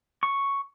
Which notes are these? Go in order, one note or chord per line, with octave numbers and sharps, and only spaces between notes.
C#6